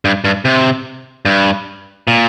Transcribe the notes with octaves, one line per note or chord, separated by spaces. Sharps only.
G2
G2
C3
G2
A#2